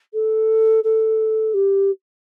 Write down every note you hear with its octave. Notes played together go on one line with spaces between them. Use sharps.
A4
A4
G4